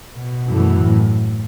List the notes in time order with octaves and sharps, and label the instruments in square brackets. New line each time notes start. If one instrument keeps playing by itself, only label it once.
[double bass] B2
[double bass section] F#2 E3 A3
[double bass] A2